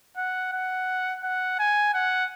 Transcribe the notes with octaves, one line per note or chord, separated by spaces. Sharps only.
F#5
F#5
F#5
G#5
F#5